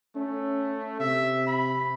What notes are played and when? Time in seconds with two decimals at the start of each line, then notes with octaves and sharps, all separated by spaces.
0.16 A3 C#4
1.00 C3 E5
1.47 B5